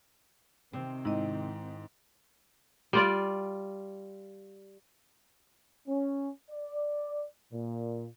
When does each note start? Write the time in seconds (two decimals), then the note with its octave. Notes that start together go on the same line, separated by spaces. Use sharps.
0.73 C3 D#3 C4
1.05 G#2 E4 D#5
2.93 G3 F4 D5
5.87 C#4
6.50 D5
7.52 A#2